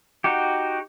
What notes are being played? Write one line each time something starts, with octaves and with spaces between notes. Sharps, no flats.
D#4 F#4 G4